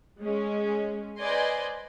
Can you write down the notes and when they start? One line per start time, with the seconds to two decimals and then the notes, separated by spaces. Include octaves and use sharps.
0.21 G#3 C#4
1.18 B4 C5 D5 D#5 G#5 C6